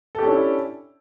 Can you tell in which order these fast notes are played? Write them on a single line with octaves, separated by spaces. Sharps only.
A4 G4 C#4 D4 E4